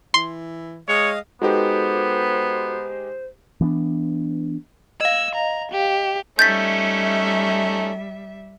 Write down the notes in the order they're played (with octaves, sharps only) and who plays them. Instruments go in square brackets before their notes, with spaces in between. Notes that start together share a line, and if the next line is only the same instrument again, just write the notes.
[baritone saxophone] E3 [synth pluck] C6
[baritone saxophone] G#3 [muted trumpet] C#5 [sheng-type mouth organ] D#5 F5 D#6
[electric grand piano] G#3 D#4 G4 [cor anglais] B3 [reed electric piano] F#4 A4 B4 [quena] C5
[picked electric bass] E3 B3 D4
[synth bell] D#5 F5 [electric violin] E6
[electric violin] A#5
G4
[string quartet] G3 E5 [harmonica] A3 C#4 D#4 [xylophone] G6 A6 B6